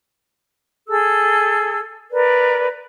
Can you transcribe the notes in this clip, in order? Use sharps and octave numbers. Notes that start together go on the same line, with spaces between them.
G#4 A4 E6
A#4 B4 D5